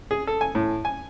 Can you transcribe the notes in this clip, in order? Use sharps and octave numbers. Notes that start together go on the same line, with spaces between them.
G#4
A4
G#5
A2
G#5